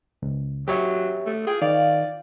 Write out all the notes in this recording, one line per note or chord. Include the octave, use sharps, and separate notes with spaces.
C#2
F#3 G4 C#5 E5
A3
F4 G#4 G5
D#3 D5 F5